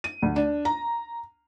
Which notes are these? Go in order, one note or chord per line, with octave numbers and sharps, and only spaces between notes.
D#7
D2
D4
A#5